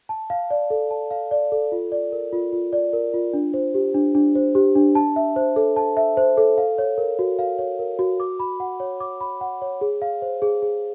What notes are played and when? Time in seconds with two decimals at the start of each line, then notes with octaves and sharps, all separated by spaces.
0.09 A5
0.30 F5
0.50 D5
0.70 A4
0.91 A5
1.11 F5
1.31 D5
1.52 A4
1.72 F4
1.92 D5
2.12 A#4
2.33 F4
2.53 F4
2.73 D5
2.93 A#4
3.14 F4
3.33 D4
3.54 C5
3.74 G4
3.94 D4
4.15 D4
4.35 C5
4.55 G4
4.75 D4
4.95 A5
5.16 E5
5.36 C5
5.56 A4
5.76 A5
5.97 E5
6.17 C5
6.37 A4
6.58 F5
6.78 C#5
6.98 A#4
7.19 F#4
7.39 F5
7.59 C#5
7.79 A#4
7.99 F#4
8.20 D6
8.39 B5
8.60 F#5
8.80 C#5
9.00 D6
9.21 B5
9.41 F#5
9.62 C#5
9.81 G#4
10.02 F5
10.22 C5
10.42 G#4
10.62 G#4